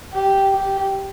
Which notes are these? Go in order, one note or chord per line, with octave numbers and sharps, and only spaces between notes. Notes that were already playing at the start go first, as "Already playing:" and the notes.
G4
G4